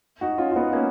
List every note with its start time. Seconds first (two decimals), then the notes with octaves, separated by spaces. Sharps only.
0.21 D#4 F#4
0.38 C#4 F4
0.52 F4
0.56 B3 D#4
0.73 A#3 C#4